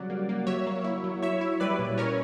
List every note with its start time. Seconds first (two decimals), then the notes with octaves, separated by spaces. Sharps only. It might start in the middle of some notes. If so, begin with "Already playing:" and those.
Already playing: C#3 F#3 G3 D5 F#5
0.10 A#3
0.29 A#3
0.47 F#3 C#5 E5
0.66 A#3
0.84 E4
1.04 F#3
1.22 E4 C#5 E5
1.41 E4
1.60 G3 B4 D5
1.79 A#2
1.98 C#4 A#4 C#5